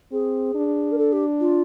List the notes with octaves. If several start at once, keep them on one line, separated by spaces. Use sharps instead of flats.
C4 G#4
D4
A#4
A4
G4
F4